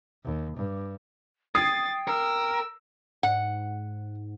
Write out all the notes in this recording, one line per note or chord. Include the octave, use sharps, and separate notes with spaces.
D#2
G2
G5 D#6 G#6 A6 C7
A#4 E6
G#2 F#5